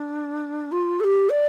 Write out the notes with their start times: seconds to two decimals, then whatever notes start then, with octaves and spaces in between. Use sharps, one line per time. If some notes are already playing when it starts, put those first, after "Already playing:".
Already playing: D4
0.72 F4
1.00 A4
1.04 G4
1.30 D5